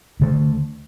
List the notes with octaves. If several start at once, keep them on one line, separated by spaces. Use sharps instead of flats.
D2 D3 A3